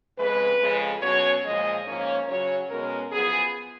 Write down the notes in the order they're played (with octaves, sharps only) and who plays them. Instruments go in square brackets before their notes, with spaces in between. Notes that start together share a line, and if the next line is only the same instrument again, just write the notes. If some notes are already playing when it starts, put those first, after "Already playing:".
[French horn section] F2 C#3 G#3 B4
F2 C#3 F3 G#3
B2 F#3 C#4 C#5
A#2 F3 G#3 D#5
G#2 F3 A#3 C#4 C#5
C#3 F#3 C#4 C#5
B2 G#3 C#4 A#4
F#2 F3 B3 G#4